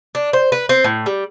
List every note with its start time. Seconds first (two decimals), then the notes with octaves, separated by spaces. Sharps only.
0.15 D4
0.33 C5
0.52 B4
0.69 C4
0.84 A2
1.06 G3